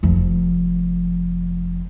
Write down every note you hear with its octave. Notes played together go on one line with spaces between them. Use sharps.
F1 F3